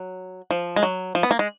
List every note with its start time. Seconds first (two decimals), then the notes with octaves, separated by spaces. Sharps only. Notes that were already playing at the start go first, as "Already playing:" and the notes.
Already playing: F#3
0.51 F3
0.76 G#3
0.83 F#3
1.15 F3
1.23 B3
1.31 A#3
1.39 G#3